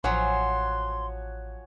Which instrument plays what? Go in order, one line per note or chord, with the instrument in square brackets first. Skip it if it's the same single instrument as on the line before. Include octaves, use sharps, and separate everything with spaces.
[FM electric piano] A1 [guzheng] F3 F#3 [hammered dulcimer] C#5 F#5 G#5 [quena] C6